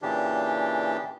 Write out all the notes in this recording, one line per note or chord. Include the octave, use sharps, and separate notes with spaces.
A#2 C#3 E3 D4 G4